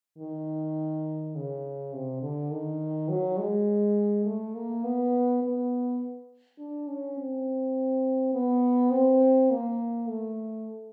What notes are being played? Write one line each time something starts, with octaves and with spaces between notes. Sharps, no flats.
D#3
C#3
C3
D3
D#3
F#3
G#3
A3
A#3
B3
B3
D4
C#4
C4
B3
C4
A#3
A3